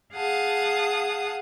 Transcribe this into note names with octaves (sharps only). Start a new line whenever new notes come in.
G#4 F5 F#5 A5 D#6